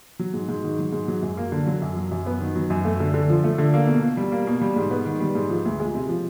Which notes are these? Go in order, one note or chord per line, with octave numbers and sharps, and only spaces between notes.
F#3
G#2
G#2
D#3
F#3
G#2
F#3
F#2
A#3
D3
F#3
F#2
F#3
F#2
B3
D#3
F#3
F#2
A3
D3
D3
F3
A3
D3
A#3
B2
B2
G3
A#3
B2
G3
G#2
B3
D#3
G3
G#2
F3
D2
G#3
C3
F3